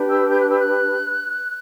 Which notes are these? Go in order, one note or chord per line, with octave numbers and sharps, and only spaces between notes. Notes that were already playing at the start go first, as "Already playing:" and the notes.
Already playing: D4 G4 B4
E6
G6
F#6
E6
F#6